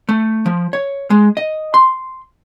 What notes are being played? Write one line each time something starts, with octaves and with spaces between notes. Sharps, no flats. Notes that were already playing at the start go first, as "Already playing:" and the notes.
A3
F3
C#5
G#3
D#5
C6